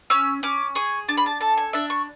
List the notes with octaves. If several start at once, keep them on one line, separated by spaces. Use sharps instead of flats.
C#4 E6
C#4 D6
G#4 C#6
D4 A5
B5
A5
A4 A5
G#5
D4 E5
C#6